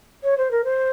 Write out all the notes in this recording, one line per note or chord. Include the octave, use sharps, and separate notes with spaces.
C#5
C5
A#4
C5